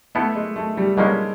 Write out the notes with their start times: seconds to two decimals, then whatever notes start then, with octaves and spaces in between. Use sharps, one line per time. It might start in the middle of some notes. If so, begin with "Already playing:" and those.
0.15 A3 B3 E4 A4
0.35 G#3
0.56 A3
0.77 G3
0.97 B2 G3 G#3 A#3 C#4 E4